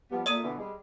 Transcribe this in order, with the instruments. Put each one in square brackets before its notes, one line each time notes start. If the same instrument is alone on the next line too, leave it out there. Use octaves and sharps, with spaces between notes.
[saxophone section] F3 G3 B3
[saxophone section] A#2 A3 [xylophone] D5 D#6 D#7
[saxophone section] B2 D3 E3
G3 G#3